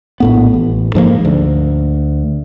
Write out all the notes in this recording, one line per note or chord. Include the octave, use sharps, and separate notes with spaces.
A#1 A2 B3
A1
G#2 F3 A3 A#3
D2